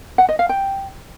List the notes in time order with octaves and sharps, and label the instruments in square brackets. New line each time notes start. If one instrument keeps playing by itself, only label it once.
[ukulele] F#5
D#5
F5
G5